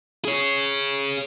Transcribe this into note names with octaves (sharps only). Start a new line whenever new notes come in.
G#4 C#5